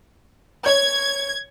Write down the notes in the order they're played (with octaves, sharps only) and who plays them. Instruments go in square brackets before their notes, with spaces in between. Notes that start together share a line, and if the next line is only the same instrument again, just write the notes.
[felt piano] C#5 [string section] G#6